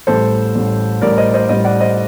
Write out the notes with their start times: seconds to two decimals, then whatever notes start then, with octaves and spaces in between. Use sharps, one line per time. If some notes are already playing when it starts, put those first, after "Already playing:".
0.07 A1 A2 G3 A4 C5
0.54 A1 A2 G3
1.02 A1 A2 G3 A#4 D5
1.17 C5 D#5
1.34 C5 D#5
1.49 A1 A2 G3 C5 D#5
1.64 D5 F#5
1.80 C5 D#5